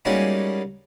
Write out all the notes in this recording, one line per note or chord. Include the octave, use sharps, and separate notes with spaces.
G3 G#3 A#3 C#4 D#4 F#4